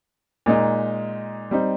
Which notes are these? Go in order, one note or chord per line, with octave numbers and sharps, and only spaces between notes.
A#2 G#3 D#4
G3 C4 D#4